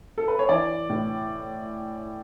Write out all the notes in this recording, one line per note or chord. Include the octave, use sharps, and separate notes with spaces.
A4
B4
C#5
E3 D5
A2